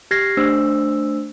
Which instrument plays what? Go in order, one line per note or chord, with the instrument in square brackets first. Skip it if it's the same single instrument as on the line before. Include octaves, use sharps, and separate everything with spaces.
[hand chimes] G4 F6 G#6 A#6 C7
A3 D4 C5 E6